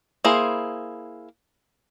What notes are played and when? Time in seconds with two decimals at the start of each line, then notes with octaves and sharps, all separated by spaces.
0.24 A#3 E4 G#4 C5